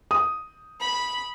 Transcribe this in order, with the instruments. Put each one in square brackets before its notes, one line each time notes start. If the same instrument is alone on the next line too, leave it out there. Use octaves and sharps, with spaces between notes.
[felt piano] D#6
[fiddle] B5